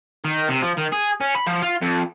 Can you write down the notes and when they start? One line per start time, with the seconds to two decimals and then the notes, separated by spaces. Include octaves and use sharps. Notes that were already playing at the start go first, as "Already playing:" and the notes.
0.25 D#3
0.49 C3
0.62 F3
0.78 D#3
0.92 G#4
1.21 C#4
1.35 B5
1.47 F3
1.62 F4
1.81 F2